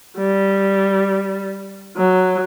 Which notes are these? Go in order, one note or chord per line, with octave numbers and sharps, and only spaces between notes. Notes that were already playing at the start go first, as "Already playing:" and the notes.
G3
F#3